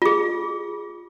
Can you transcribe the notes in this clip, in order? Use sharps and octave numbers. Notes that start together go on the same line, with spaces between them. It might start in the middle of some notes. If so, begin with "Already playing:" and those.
F4 G#4